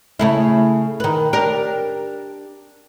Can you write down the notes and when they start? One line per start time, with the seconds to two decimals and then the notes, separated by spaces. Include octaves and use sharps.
0.19 C#3 A3 E4
1.00 D#3 B4
1.33 D4 G4 A#4